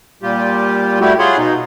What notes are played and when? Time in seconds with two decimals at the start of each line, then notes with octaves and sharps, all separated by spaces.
0.22 A#2 G3 F4 G4
1.01 G3 A3 E4 F#4 G4
1.19 F4 G#4 C#5 F#5 B5 C6
1.37 B2 D#4